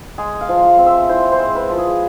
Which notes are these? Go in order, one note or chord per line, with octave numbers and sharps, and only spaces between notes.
G#3 G#4
F5
F3
F5
C4
E5
E4 C5
C5
G#3
B4
F3
G#4